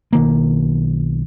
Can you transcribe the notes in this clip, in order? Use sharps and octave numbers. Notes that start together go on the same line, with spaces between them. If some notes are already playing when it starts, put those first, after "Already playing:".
B1 D#3 A#3